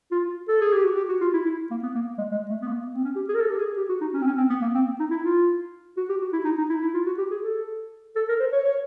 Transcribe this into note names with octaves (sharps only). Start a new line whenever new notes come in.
F4
A4
G#4
G4
F#4
G4
F#4
F4
E4
E4
A#3
B3
A#3
G#3
G#3
A3
B3
A#3
B3
C4
C#4
G4
G#4
A#4
A4
G4
G#4
G4
F#4
D#4
C#4
C4
C#4
C4
B3
A#3
C4
D#4
E4
F4
F#4
G4
F#4
E4
D#4
D#4
E4
E4
F4
F#4
G4
G#4
A4
A4
A#4
C5
C#5
C#5